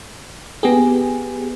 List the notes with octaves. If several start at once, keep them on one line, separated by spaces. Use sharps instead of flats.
B3 G4 G#4